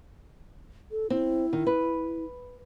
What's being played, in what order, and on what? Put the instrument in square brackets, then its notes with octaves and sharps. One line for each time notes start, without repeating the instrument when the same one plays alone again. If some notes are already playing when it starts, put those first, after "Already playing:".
[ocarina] A4
[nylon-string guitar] C4 [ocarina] E4
[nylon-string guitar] D#3
B4